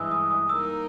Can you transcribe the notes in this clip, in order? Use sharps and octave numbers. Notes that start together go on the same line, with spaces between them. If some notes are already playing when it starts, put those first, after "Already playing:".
Already playing: G2 E3 G#3 D#6 E6
D#6
D#6
G3 A#3 D#4 A#4 E6